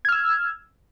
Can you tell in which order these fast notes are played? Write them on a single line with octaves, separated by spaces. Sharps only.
G#6 F6 E6